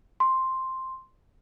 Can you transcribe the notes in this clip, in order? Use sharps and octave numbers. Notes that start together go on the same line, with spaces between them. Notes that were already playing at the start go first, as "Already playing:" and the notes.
C6